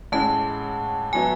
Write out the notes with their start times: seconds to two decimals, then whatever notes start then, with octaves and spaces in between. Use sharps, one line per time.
0.12 A1 A2 G#3 C#4 G#4 A5
1.13 A2 F#3 B3 E4 G#5